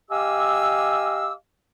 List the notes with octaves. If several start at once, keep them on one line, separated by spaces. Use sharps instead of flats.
G4 D#5 F5 G#5 D6 E6